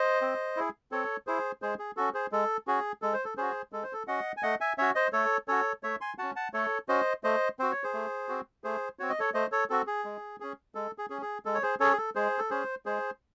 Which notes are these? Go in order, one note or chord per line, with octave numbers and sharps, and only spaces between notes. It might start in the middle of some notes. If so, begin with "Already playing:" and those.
Already playing: C5 D#5
C4
E4 G#4
C4 A4 C#5
E4 G#4 C5
G#3 G#4 C5
G#4
C#4 F#4 A4
G#4 C5
G#3 A4
C#4 F#4 G#4
G#3 A4
C5
A4
C#4 F#4 G#4 C5
G#3 A4
C5
A4
C#4 F#4 D#5 F#5
G#5
A3 D#5 F#5
E5 G#5
C#4 F#4 C#5 E5
C5 D#5
A3 A4 C#5
C#4 F#4 A4 C#5
A3 C#5 E5
G#5 C6
C#4 F#4 F#5 A5
F#5 A5
A3 A4 C#5
C#4 F#4 C5 D#5
A3 C5 D#5
C4 F#4 C5
C#5
G#4 C5
A3
C4 F#4
A3 G#4 C5
C4 F#4 C#5
D#5
A4 C#5
A3 C5 D#5
A4 C#5
C4 F#4 A4
G#4
G#3
C#4 G#4
G#3 A4
G#4
C#4 G#4
G#4
G#3 A4
C#5
G#4 C5
C#4 G#4 A4 C#5
G#4
A4
G#3 G#4 C5
A4
C#4 G#4 C5
G#3 G#4 C5